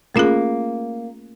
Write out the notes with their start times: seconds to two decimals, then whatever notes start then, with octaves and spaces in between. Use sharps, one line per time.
0.15 A3 A#3 C#4 F4 G#4